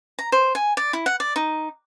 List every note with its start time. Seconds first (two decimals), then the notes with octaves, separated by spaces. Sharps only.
0.19 A#5
0.32 C5
0.55 G#5
0.77 D5
0.93 E4
1.06 F#5
1.20 D5
1.36 D#4